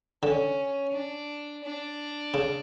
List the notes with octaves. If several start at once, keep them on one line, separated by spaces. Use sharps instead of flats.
D3 C#4
D4
D4
C#3